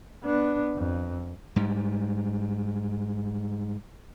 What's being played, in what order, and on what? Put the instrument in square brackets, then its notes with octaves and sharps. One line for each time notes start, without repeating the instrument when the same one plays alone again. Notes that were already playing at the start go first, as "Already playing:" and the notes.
[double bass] B3 D4
F2
[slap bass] G#2 G3